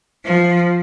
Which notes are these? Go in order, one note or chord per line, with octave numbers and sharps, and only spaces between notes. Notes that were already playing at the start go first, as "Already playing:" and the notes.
F3